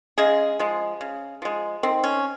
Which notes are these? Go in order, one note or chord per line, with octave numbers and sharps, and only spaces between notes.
C#3 G#3 G#4
F3 G#3
C#3
F3 G#3
D#3 C4
C#4